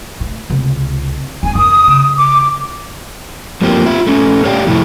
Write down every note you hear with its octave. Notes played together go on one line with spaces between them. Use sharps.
A2
C#2 C3
D1 C4 G#5
F#2 D#6
C#3
D6
F#2 F3 A#3 C4 G4
F4 E5
A3 C#4
A2 G4 C#5 D5 F5 G5
F2 A2 C3 E4